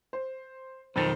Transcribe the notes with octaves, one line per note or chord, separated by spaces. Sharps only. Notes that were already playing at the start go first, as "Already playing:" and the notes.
C5
B1 F2 D#3 C5 A6